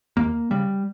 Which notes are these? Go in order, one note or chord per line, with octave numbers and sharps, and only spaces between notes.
D#2 A#3
C#3 G3